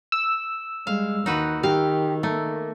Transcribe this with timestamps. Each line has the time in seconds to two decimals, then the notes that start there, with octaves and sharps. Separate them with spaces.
0.12 E6
0.87 G3 G#3 F5
1.26 D#2 D#3 D#4 F#4 B4
1.63 D#3 G4 F5
2.23 A3 A#3